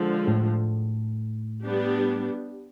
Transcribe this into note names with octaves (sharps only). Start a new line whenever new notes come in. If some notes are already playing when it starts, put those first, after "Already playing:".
Already playing: D3 F3 G#3
A2
G3 B3 D4 G4